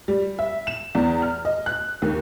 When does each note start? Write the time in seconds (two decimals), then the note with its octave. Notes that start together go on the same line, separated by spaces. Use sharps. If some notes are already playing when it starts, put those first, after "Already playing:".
0.08 G3
0.39 E5
0.67 E7
0.95 E2
1.22 F6
1.45 D#5
1.66 F#6
2.02 D#2